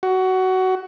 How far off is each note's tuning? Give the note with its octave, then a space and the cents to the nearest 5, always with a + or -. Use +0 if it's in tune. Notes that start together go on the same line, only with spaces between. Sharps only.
F#4 +15